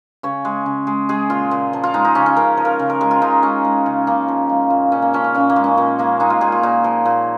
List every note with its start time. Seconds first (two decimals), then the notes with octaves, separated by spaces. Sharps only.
0.23 C#3 C#5
0.45 G#3
0.66 C#3
0.87 G#3
1.09 G#3 G#4
1.30 A#2 F4
1.51 A#2
1.73 F3
1.83 F4
1.94 G#3 D#4
2.05 D#4
2.15 C#3 C#4
2.26 C#4
2.37 C#3 A#4
2.57 F3
2.65 A#4
2.79 C#3
2.90 A#4
3.01 G#3 G#4
3.11 F4
3.21 C#3 D#4
3.42 G#3 C#4
3.65 G#3
3.86 C#3
4.07 C#3 A#3
4.28 F3
4.49 G#3
4.70 A#2
4.92 A#2 C#4
5.02 A#3
5.13 F3 C#4
5.24 C#4
5.35 A#2 C#4
5.49 A#3
5.56 G#3
5.64 C#4
5.77 A#2 A#3
5.99 G#3 A#3
6.20 G#3 D#4
6.30 F4
6.41 A#2 G#4
6.52 F4
6.63 A#2 D#4
6.84 F3
7.05 A#2